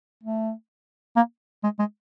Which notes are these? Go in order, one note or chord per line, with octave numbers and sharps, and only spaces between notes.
A3
A#3
G#3
G#3